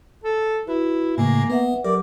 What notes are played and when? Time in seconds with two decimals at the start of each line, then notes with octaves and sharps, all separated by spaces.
0.24 A4
0.67 E4 F#4 B4
1.18 A2 C#3 A3 A#3 G#5
1.50 B3 B4 E5 F#5
1.84 F#3 G4 A#4 D5 D6